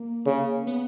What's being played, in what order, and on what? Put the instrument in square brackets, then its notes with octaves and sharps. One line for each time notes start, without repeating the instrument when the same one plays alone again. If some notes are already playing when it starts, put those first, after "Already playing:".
Already playing: [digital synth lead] A#3
[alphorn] C#3
[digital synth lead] B3